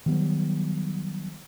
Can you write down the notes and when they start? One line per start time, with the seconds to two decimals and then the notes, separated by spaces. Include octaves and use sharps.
0.06 D#3 F#3 G3 B3